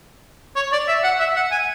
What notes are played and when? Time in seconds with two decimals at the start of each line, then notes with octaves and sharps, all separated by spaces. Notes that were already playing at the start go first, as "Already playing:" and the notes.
0.56 C#5
0.72 D5
0.88 E5
1.04 F#5
1.20 E5
1.36 F#5
1.52 G#5